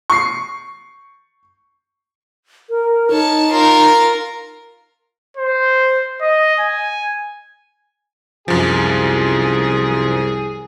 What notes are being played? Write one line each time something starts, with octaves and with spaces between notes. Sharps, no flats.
C#6 C7
A#4
D#4 C#5 A5
F4 A#4
C5
D#5
G#5
C2 F#2 F3 G#4